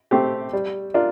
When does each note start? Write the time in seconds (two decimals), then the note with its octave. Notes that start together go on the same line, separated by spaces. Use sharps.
0.11 A3 C4 G4
0.53 G3
0.94 D4 F4 A#4